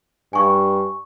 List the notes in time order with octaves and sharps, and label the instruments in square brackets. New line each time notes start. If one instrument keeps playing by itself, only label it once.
[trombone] G2 [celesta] G#5 C#6